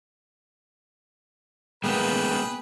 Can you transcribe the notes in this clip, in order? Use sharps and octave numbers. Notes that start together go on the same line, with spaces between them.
G#3 A#3 B3 G#4 B4 G5